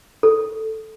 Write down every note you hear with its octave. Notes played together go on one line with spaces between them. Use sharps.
A4